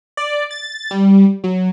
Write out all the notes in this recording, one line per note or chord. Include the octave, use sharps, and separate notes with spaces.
D5
A6
G3
F#3